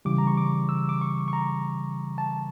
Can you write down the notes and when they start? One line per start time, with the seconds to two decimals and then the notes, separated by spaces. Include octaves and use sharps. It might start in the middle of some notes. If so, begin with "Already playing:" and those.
0.05 C#3 E3 G3 D6
0.18 A#5
0.27 C#6
0.37 D6
0.69 E6
0.89 D6
1.01 C#6
1.28 C#6
1.33 A#5
2.18 A5